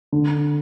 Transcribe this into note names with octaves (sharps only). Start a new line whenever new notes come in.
D3